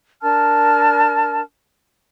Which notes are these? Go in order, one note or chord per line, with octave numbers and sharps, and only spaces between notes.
D4 A#4 A5 F6